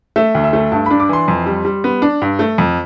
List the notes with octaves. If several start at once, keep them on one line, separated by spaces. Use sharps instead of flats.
A3 E5
D2
E5
A3
G2 A5
D4 B5
D6
E3 C6
F2
G3
G3
B3
D4
G2
A3
F2